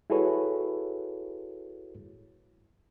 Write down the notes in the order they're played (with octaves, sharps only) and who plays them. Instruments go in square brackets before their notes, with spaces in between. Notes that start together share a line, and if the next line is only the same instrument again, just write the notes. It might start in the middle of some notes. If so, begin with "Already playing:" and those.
[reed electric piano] E4 F#4 G#4 A4 B4 C#5